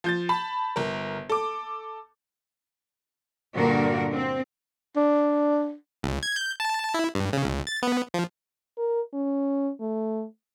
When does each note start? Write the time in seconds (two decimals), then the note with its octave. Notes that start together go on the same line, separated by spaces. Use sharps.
0.04 F3 G6 A6
0.29 A5 B5
0.76 G1 A#4
1.30 A4 D6
3.55 G2 A#2 D3 A#3 F#4 A#4
4.13 C4
4.97 D4
6.03 C#2
6.23 G#6
6.36 G6
6.60 A5
6.94 E4
7.15 G2
7.33 C#3
7.44 C#2
7.67 A6
7.82 B3
8.14 F3
8.78 A#4
9.14 C#4
9.80 A3